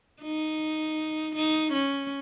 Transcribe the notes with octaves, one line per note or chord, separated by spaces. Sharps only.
D#4
D#4
C#4